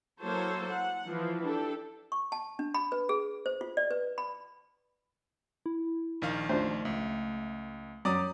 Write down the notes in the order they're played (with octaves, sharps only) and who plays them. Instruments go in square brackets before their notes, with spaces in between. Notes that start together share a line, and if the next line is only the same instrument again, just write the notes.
[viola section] F#3 A#3 E4 A4 C5 C#5
F#5
E3 F3 E4
D4 G4 A4
[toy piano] C#6
A5
D4
B5
B4
G#4
C5
F4
D5
B4
B5
[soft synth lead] E4
[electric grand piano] A#1 D#3 F5
[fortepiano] F3 D4 C5 [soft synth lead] A3
[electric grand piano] C#2 [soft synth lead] A3
[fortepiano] F#2 [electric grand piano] D5 D6 D#6 [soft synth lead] A#5